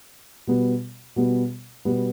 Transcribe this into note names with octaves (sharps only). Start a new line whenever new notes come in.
B2 G3 B3
B2 G3 B3
B2 G3 B3